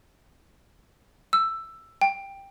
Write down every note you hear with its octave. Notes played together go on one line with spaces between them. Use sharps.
E6
G5